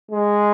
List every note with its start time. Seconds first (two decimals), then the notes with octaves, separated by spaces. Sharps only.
0.11 G#3